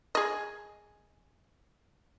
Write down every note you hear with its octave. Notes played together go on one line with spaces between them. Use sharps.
G#4 D#5